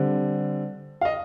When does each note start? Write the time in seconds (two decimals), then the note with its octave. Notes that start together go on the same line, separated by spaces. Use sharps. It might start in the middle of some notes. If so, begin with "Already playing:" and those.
Already playing: D3 G3 C4
1.01 F5
1.05 D#5